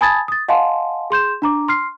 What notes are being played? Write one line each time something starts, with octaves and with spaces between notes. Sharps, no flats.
G#5 A5 B5 D#6 G#6 A6
D#6 A6
D#5 F5 F#5 G#5 A5 C6
G#4 C6 G6 E7
D4 A#5 D6
C6 F6 C7